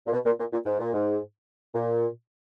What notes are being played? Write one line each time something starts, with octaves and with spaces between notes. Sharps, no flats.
A#2
B2
A#2
A#2
A#2
G#2
A#2
G#2
A#2